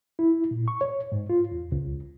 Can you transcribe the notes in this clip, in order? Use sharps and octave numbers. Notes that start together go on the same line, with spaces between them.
E4
A#2
C#6
C#5
G#2
F4
E2
C#2